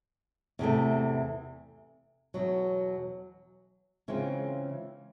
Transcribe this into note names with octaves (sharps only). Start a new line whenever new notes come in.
E2 C3 E3 A3
E2 B2 F#3
C#3 E3 G#3 C4 F4